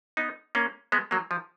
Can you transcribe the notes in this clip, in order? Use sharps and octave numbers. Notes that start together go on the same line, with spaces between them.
B3 D#4
A#3 C#4
G#3 B3
F#3 A#3
F3